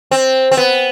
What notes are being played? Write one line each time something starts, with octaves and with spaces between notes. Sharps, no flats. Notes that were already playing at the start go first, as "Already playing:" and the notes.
C4
C4
B3